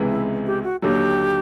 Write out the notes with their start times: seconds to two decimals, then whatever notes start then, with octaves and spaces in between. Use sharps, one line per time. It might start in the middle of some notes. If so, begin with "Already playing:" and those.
Already playing: C#2 C3 E3 G#3 B3
0.09 E4
0.47 G4
0.64 F#4
0.82 D#2 D3 F#3 G4